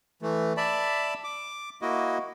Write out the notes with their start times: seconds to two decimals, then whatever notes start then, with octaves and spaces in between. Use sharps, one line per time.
0.22 E3 A3
0.57 D5 E5 A5 B5
1.24 D6
1.82 A#3 E4 F#4 D#5